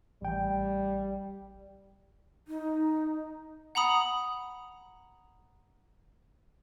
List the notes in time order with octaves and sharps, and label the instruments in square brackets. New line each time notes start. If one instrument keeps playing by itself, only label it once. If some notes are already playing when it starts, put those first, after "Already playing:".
[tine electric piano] A1 G5 [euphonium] G3
[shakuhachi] D#4
[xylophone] F#5 A#5 B5 D#6